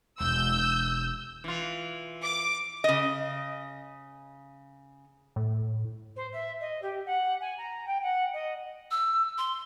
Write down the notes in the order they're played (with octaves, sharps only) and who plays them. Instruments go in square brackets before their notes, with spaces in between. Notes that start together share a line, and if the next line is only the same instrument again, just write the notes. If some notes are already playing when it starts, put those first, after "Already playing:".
[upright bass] E1 [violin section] E6 G6
[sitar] E3 F4
[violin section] D6
[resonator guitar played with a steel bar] C#3 D#5
[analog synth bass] A2
[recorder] C5
E5
D#5
G4
F#5
G#5
A#5
G5
F#5
D#5
[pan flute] E6
C6